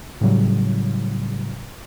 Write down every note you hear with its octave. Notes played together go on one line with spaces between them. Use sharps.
A2 C#3 F#3 G3